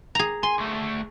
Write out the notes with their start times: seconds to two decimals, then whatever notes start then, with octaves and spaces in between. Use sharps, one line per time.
0.15 G#4 A#5
0.43 G#5 C6
0.58 D2 A3